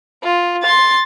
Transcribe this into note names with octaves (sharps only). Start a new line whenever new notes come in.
F4
C6 A6